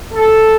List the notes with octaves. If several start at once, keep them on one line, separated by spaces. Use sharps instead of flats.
A4